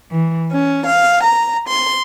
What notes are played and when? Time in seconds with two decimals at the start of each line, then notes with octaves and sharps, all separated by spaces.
0.11 E3
0.52 C#4
0.86 F5
1.23 A#5
1.69 C6